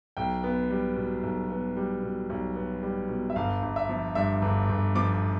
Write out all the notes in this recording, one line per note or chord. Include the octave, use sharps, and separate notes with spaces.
B1 G5
B3
G3
B2
B1
B3
G3
B2
B1
B3
G3
B2
E5
G1 F5
G1
E5
F3
G2 E5
G1
G1
F3 D6